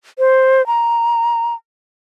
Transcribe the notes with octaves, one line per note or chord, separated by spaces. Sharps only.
C5
A#5